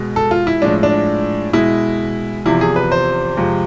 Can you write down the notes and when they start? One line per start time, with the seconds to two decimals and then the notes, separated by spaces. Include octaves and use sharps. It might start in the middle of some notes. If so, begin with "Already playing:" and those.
Already playing: B2 G#3
0.16 A4
0.31 F4
0.47 E4
0.62 A2 F3 G#3 D4
0.83 D4
1.53 B2 G#3 E4
2.46 E2 C3 F3 E4
2.61 G#4
2.76 B4
2.92 C5
3.37 F2 C3 F3 G#3